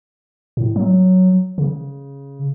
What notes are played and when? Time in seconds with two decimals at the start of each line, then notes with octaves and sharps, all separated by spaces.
0.57 A2
0.76 F#3
1.58 C#3